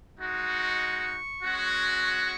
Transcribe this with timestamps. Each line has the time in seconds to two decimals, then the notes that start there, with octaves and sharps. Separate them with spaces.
0.18 G#3 D#4 F#4
0.50 C#6
1.43 G#3 C#4 F#4
2.05 C#6